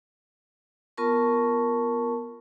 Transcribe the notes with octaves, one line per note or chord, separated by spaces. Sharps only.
B3 F4 A#4 A5 C#6